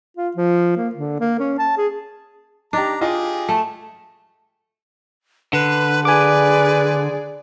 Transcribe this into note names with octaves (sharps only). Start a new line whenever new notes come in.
F4
F3
A#3
D3
A#3
C#4
A5
G#4
D4 D#4 G4 A#5
F4 G4 G#4 D#5
A3 A5
D3 B4
G#4 B4 D5 G#5 D6